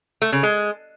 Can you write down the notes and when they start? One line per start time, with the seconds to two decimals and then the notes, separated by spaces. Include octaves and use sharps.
0.22 A3
0.32 C#3
0.43 G#3